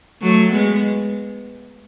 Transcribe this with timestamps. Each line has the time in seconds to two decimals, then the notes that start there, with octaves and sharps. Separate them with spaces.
0.22 F#3 A3
0.52 G#3 B3